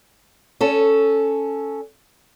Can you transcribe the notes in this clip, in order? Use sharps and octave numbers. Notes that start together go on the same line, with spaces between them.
C#4 A4